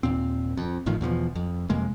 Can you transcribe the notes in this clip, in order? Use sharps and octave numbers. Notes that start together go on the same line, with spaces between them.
D#2 A#2 C4
F2
G#1 A2 D#3 F3
E2 B2 D#3 F3
F2
F2 C3 G#3 A#3